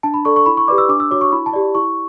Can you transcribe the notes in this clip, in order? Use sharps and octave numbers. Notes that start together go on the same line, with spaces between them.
D4 A5
B5
A4 D5 C#6
C#6
E4 B5
C#6
G4 B4 D5 D6
E6
D4 D6
E6
F#4 C#5 D6
C#6
E4 B5
A5
G4 D5
E4 C#6